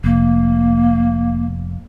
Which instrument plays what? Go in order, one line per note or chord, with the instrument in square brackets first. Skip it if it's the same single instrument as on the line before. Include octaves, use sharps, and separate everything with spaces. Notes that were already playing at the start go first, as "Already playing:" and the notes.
[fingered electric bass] F1 [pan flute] A#3